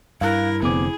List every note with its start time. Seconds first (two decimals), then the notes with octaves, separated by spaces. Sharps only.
0.21 G2 E4 A#4 F5 F#6
0.63 F1 D3 B3 C4 G#4 D6